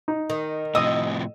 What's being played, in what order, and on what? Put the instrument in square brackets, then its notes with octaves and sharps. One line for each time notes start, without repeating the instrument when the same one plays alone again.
[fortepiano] D#4
[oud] D#3
[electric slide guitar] A2 C3 F3 [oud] D#5 [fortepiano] D#6 E6